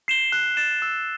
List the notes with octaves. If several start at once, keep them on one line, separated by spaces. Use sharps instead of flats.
C7 E7 G7
F#6
A6 E7
E6